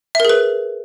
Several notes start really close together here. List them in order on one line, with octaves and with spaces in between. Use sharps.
E5 A#4 G#4 B4